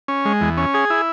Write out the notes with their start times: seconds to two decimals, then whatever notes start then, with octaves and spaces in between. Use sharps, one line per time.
0.08 C#4
0.25 G#3
0.41 E2
0.57 C#4
0.74 G#4
0.90 E4